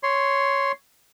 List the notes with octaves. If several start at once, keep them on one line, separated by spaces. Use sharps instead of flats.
C#5 C6